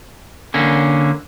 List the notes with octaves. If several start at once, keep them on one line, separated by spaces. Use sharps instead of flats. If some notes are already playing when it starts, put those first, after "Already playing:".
D3 A#3 C#4